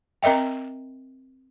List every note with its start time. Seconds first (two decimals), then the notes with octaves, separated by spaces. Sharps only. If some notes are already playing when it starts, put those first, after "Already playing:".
0.23 C4 A#4 D#5 E5 G5